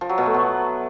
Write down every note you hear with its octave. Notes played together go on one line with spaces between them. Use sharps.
F3
F#3
B2
A3
B3